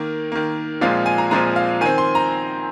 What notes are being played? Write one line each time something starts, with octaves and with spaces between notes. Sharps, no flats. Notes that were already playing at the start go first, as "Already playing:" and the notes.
Already playing: D#3 A#3
D#3 A#3
A#2 F3 G#3 C4 F5
G#5
A#5
A#2 F3 G#3 C4 A#5
F5
D#3 C4 G#5
C6
A#5